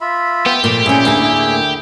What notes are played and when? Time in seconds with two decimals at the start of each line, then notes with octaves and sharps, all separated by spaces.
0.01 F4 E5 B5
0.46 B3 G4
0.64 A#2 F3 A3 A#3
0.86 A#2 C#4 E4 G#4
1.05 D2 A2 A#3 E4 G#4 A#4